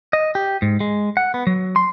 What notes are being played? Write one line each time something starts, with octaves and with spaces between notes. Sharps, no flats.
D#5
G4
G#2
G#3
F#5
B3
F#3
C6